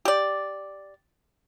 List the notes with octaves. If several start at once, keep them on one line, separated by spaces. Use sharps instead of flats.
G4 D5